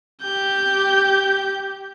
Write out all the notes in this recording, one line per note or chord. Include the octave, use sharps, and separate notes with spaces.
G4 G6